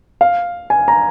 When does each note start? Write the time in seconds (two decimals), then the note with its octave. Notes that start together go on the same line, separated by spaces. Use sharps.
0.21 F5
0.70 G#5
0.88 A#5